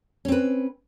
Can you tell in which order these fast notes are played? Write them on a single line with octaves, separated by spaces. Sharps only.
C#4 C4 B4